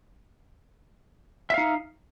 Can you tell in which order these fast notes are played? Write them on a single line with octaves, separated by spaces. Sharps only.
E5 F5 D#4